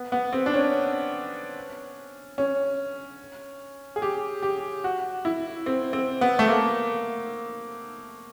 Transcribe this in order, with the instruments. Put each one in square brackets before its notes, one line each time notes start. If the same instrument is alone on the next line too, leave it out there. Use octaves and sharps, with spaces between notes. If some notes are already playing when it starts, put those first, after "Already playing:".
Already playing: [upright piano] B3
B3
C4
D4
C#4
C#4
G#4
G4
G4
F#4
E4
C4
C4
B3
A3
A#3